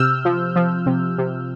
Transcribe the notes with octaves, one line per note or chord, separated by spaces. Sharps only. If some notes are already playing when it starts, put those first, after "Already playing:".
Already playing: C3 E6 F6 G6
F3
F3
C3
C3